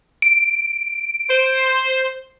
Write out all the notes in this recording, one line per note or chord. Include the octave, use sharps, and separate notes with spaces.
D7
C5